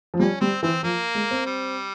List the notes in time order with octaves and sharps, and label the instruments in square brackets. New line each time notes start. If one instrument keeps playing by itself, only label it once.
[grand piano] F3
[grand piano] G3 [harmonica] C#4
[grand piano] G3 [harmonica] C4
[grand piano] E3 [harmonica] C4
[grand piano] F3 [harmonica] A#3
[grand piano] G#3
C4
[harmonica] G3